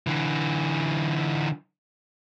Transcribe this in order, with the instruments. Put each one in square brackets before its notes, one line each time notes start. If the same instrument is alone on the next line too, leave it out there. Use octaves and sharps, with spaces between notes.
[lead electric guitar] D3 E3